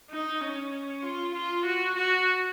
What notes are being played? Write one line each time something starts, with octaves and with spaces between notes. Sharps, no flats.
D#4
C#4
F4
F4
F#4
F#4